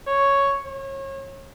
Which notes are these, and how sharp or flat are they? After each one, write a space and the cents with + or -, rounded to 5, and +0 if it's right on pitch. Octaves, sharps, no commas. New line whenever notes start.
C#5 +0
C#5 -30